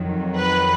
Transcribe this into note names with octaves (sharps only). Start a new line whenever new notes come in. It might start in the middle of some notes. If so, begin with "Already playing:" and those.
Already playing: F2 D#3 F#3
B4